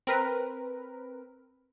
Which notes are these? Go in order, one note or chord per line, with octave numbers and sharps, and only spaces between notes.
C4 A#4 B4